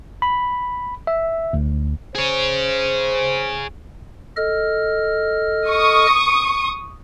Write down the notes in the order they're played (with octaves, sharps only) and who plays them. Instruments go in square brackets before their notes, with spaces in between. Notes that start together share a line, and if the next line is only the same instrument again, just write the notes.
[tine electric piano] B5
E5
D2
[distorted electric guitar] G#4 C#5 [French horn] C5
[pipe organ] A4 D#5 F6
[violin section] C#6 D#6